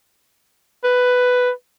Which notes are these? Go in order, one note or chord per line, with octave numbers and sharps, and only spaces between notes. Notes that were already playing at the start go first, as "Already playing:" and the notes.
B4